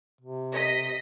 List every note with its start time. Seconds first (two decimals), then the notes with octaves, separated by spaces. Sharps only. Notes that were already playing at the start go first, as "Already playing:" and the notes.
0.21 C3
0.53 D#5 B6